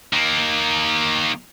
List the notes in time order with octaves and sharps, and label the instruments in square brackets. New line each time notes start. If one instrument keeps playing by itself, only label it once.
[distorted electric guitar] D#3 A#3